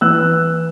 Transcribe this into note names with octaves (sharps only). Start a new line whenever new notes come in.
E3 E6 F#6